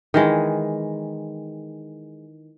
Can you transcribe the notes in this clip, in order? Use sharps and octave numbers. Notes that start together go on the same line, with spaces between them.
D#3 E3 G#3